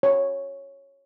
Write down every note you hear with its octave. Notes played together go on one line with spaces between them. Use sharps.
C#5